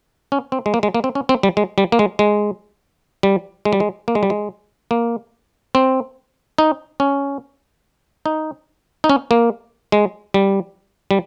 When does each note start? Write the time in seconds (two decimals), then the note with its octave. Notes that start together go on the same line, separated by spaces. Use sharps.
0.32 C#4
0.52 C4
0.66 G#3
0.74 A#3
0.83 G#3
0.95 A#3
1.04 C4
1.15 C#4
1.29 C4
1.43 G3
1.57 G#3
1.78 G3
1.92 A#3
1.99 G#3
2.19 G#3
3.23 G3
3.65 G#3
3.73 G3
3.80 G#3
4.08 A#3
4.15 G#3
4.23 G3
4.30 G#3
4.91 A#3
5.75 C4
6.59 D#4
7.00 C#4
8.26 D#4
9.04 D#4
9.10 C#4
9.31 A#3
9.92 G#3
10.34 G3
11.11 G3